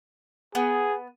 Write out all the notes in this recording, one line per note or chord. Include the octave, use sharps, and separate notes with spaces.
B3 G#4